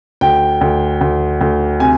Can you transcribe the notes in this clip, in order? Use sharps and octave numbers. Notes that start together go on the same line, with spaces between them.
D2 G5
D2
D2
D2
C3 G#5